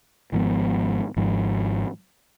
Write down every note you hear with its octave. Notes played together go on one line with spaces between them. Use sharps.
G#1 G#2 F3 B3
G#1 G#2 F3